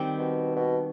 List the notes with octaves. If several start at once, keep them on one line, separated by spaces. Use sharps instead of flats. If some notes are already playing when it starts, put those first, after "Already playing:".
Already playing: D#3 G3 C4
B2
B2